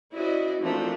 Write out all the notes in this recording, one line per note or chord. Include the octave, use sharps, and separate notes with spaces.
C#4 E4 F#4 C5 D5 D#5
A#2 E3 F3 A3 C4 D4